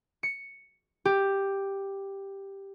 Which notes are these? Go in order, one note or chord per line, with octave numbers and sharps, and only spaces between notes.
C#7
G4